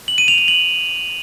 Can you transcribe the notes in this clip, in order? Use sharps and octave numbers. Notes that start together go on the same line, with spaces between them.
F#7
D#7
F7
F7
F#7